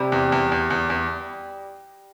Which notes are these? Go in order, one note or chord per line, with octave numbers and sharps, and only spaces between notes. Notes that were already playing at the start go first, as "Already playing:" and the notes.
Already playing: C3 G3
E2
E2
E2
E2
E2